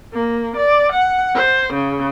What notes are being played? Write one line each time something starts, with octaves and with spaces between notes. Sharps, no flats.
A#3
D5
F#5
C5
C#3